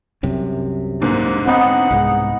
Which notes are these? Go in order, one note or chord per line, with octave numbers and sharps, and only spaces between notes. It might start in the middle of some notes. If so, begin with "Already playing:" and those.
C2 F#2 C3
G#2 D3 A#3
B3 C4 D#4 F#5
C2 G#2 G#3